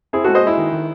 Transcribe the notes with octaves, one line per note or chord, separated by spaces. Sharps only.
C4 E4 G#4
G#3 F#4 A4
C5 D#5
G#3 E4
D#3
D#3